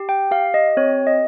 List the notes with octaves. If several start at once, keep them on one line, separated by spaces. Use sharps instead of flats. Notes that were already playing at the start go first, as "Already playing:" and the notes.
Already playing: G4
G5
G4 F5
D#5
C4 C#5
D#5